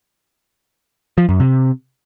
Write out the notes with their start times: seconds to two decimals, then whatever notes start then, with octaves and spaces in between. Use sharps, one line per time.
1.18 F3
1.29 F#2
1.40 C3